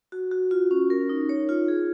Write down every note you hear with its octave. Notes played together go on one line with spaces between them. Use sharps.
F#4
F#4
F4
C#4
A#4
D#4
C#5
F4
G#4